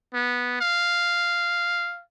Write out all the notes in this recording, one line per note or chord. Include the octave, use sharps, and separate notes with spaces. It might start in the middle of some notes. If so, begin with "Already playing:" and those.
B3
F5